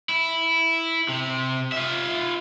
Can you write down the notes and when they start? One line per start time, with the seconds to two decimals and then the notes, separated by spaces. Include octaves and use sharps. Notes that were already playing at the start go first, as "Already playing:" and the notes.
0.09 E4
1.09 C3
1.72 F4 E5